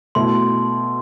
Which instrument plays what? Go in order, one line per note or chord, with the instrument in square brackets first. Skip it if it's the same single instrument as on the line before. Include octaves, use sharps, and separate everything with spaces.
[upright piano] B2 A3 E4 [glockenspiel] C6